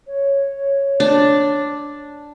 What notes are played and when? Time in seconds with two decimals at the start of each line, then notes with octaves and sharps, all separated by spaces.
0.07 C#5
1.00 D4